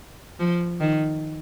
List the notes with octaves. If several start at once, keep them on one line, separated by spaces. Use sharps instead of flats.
F3
D#3